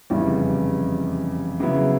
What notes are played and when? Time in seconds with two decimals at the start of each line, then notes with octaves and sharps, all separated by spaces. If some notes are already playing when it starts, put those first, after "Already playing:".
0.10 F1 E2 C#3 E3 G3
1.60 C#3 F#3 B3 E4